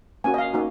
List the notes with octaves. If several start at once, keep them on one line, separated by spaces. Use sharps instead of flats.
A#3 C#4 F#4 G#5
D#5
F5
A#3 D#4 F#4